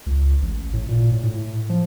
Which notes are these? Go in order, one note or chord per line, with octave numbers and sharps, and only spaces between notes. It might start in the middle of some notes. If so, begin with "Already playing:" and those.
C#2
A1
A2
A#2
A2
A2
F3